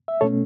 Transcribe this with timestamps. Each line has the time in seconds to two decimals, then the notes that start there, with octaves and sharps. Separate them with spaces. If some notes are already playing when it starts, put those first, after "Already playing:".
0.08 E5
0.21 B2 A3 C#4 A4 C#5